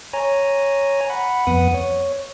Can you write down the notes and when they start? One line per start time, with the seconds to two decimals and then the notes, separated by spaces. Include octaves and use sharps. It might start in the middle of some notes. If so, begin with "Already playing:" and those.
0.13 C#5 G#5 A#5
1.10 F#5 B5
1.47 F2 B3 F#5 D#6
1.74 C#5